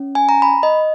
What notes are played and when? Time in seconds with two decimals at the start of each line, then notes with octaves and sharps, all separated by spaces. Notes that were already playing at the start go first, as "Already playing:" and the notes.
Already playing: C#4
0.15 G#5
0.29 A#5
0.42 B5
0.63 D#5